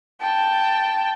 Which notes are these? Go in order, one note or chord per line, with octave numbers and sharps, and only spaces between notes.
G5 A5